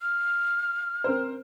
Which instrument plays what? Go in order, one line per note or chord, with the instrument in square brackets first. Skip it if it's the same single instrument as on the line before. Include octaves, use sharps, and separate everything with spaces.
[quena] F6
[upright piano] C4 A#4 C5